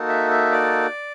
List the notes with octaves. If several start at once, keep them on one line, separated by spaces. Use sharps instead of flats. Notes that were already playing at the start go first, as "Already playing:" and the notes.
Already playing: A#3 D#4 F#4 A4
E5
E5
D5